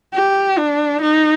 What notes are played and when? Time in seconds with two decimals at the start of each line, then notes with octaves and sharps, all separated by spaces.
0.14 G4
0.58 D4
1.02 D#4